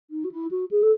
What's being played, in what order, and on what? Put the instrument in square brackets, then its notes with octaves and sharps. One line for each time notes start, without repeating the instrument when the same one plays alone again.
[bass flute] D#4
F#4
E4
F#4
G#4
A4